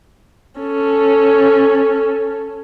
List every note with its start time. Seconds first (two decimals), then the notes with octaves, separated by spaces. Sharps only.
0.61 C#4 A4